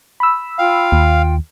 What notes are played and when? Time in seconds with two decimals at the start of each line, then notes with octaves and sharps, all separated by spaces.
0.20 B5 E6
0.58 F4 F5 G5
0.92 D#2